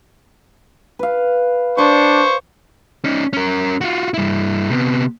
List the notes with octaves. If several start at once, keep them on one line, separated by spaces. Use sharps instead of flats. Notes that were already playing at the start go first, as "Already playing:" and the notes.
B4 F5
D4 C5 C#6 D6
C#4 D#4
C#4 A#4
F4 F#4
G2 E4
C3 B3